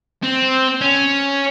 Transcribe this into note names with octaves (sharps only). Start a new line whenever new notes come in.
C4
C#4